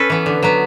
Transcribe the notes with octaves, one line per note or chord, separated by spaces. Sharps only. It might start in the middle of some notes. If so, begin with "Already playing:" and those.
Already playing: C#4 A4 B4
E3 B3
D3
F#3 B3